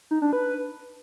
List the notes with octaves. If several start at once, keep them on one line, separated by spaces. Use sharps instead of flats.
D#4
D4
B4